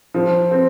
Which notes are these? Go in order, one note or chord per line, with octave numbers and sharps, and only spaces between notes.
F3
C4